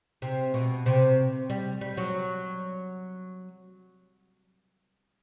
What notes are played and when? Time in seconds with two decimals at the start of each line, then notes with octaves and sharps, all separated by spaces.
0.22 C3
0.54 B2
0.86 C3
1.50 G3
1.81 G3
1.97 F#3